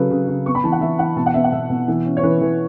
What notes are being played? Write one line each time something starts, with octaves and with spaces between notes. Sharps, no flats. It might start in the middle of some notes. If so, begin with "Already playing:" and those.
Already playing: C#3 F#3 A4 B4
C#3
C#3
B3 C#6
B5
E3 A5
F#5
E3 E5
E3 F#5
B2 A5
F#5
B3 E5
F#5
B2 E5
B2
E3
C#4
C#5
E3 B4
E3